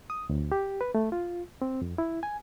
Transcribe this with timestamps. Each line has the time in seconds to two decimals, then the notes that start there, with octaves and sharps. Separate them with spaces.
0.10 D#6
0.30 D2
0.52 G4
0.81 B4
0.95 A3
1.12 F4
1.62 C4
1.82 F2
1.98 E4
2.23 G#5